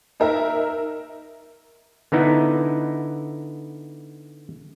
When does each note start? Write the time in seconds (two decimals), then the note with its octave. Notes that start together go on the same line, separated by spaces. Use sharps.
0.20 D#4 A#4 E5
2.12 D3 B3 D#4 E4